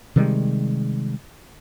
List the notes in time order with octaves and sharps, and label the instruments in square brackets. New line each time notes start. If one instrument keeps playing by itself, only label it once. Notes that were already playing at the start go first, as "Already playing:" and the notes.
[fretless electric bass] C3 D#3 G3 G#3